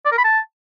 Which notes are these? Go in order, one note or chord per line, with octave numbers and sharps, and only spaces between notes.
D5
A#4
B5
A5